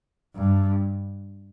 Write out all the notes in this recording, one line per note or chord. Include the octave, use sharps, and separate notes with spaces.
G2